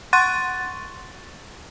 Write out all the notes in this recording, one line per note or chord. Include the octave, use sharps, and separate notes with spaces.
F#5 C6 C#6 F#6 A6 D#7